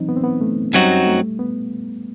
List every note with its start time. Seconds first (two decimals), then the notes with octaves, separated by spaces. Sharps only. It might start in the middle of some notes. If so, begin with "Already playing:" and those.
Already playing: E3 F#3 C4 D#4
0.09 B3
0.16 C4
0.24 B3
0.41 A3
0.74 F#2 F#3 G3 C4 D#4 F#4
1.07 A3
1.39 B3